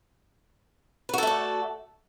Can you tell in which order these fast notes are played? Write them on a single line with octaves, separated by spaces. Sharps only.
B4 F#4 A4 A3 D5